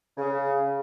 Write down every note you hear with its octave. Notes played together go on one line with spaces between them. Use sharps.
C#3